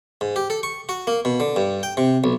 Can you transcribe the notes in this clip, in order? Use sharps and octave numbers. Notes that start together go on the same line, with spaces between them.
G#2
G4
A4
C#6
F#4
A#3
B2
D3
G2
G5
C3
B1